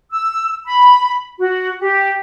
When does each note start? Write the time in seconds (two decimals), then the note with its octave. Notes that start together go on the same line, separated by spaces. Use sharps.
0.10 E6
0.66 B5
1.40 F#4
1.80 G4